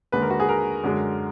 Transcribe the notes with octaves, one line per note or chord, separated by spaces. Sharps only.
D#2 D3 G#3 B4
A#4
F#4
G#4
A#4
F#2 D3 G#3